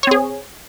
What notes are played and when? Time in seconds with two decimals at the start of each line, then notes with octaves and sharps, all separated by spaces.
0.03 C#5
0.07 C4
0.11 G#4